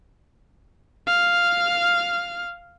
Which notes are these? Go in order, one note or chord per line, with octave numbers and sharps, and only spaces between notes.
F5 F6